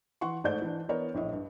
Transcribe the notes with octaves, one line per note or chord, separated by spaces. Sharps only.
E3 F#5 C6 C#6
G#2 A3 D5 G6
E3 D4
E3 B3 A#4 C#5 D5
A#1 A2 D#5
G2